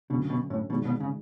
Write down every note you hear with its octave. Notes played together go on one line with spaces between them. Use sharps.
D2 B2 D3 F#3 C#4
B2
A2
G#1 G#2 B2 G#3
B2
C#3